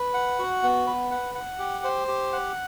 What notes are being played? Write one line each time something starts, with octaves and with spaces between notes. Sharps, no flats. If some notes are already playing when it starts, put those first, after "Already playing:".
Already playing: B4
F#5
F#4
B3
B4
F#5
F#5
G4
C5
G4
F#5